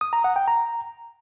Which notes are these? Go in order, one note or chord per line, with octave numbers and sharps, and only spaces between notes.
D#6
A#5
F#5
G5
A#5